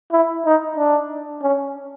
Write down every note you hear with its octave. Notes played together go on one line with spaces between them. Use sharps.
E4
D#4
D4
C#4